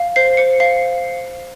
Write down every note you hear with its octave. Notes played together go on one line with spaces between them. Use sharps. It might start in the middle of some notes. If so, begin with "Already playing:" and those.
Already playing: F5
C5 C7
C5 C#7
F5 C7